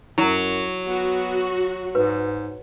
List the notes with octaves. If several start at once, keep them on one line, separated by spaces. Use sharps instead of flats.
F#2 F#3 E4
B3 F#4
G#2 B4